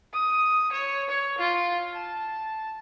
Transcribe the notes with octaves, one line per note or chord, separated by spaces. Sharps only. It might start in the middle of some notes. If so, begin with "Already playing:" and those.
D#6
C#5
C#5
F4
A5